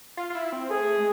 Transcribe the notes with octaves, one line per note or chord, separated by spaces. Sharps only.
F4
F4
E4
C4
A3 G#4
G#3